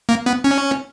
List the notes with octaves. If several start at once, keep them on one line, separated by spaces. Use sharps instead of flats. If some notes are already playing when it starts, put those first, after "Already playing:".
A#3
B3
C#4